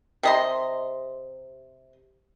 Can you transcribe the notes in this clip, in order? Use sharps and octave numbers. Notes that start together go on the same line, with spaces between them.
C3 D#5 C6